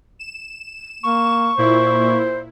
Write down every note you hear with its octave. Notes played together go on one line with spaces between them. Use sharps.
E7
A#3 C#6
A#2 E4 C5